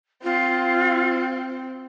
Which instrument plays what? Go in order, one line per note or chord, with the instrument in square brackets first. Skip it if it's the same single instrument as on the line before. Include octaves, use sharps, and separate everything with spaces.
[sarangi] C4 [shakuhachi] F4